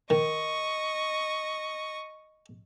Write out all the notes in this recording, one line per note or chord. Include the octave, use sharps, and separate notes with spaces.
D#3 D#5 C#6